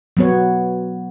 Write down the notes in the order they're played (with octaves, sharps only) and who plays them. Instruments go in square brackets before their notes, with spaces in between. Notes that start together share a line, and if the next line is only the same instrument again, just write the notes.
[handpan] F#3 B3 C#5